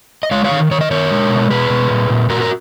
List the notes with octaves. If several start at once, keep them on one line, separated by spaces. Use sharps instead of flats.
D#5
G#3 C#5 F5
C#5 F5
D#3
D#3 C#5
D#5
D#3 A#4 C#5
G#3
B2
B2 G#4 B4
B2
A#2
A#2
A#2 F#4 A#4
A#4